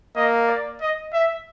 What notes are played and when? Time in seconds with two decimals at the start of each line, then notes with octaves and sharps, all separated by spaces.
0.15 A#3 D#5
0.47 D5
0.81 D#5
1.13 E5